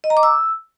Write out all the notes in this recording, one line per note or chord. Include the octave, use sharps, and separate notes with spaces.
D#5
A#5
D6
E6